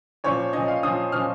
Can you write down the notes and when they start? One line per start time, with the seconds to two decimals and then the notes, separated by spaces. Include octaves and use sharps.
0.24 A#2 F3 C#4 C#5
0.53 A#2 F3 C#4 D#5
0.68 F5
0.83 A#2 F3 C#4 D#6
1.12 A#2 F3 C#4 F6